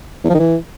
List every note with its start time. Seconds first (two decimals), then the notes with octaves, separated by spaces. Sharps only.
0.24 E2
0.29 F3
0.35 D#3
0.40 E3